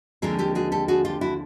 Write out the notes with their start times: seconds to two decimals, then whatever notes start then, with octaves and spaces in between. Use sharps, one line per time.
0.22 D#2 D3 F3 G#3 C4 G#4 A#4
0.39 G4 A4
0.55 F#4 G#4
0.72 G4 A4
0.88 F#4 G#4
1.05 F4 G4
1.21 E4 F#4